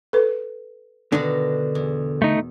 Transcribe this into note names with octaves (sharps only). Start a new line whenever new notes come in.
A4 B4
B2 D3 D#3 D4
E2
A3 D#4